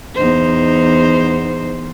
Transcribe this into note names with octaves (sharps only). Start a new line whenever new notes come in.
E2 D#4 C5